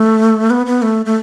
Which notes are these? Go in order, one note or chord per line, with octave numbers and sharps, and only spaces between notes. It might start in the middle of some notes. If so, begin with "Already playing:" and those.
Already playing: A3
B3
B3
A3
A3